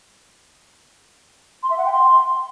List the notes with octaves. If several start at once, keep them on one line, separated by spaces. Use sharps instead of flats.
C6
E5
F#5
G5
C6